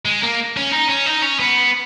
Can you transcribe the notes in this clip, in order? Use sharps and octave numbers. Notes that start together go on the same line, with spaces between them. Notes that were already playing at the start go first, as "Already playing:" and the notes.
G#3
A#3
C#4
D#4
C#4
D#4
C#4
B3